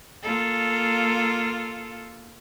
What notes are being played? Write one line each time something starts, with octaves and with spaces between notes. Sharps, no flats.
A#3 F4 A4